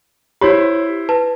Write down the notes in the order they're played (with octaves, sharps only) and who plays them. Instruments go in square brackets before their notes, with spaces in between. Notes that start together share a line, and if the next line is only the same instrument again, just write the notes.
[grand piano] E4 C5 B5 [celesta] G4 C#5
[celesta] B4 A5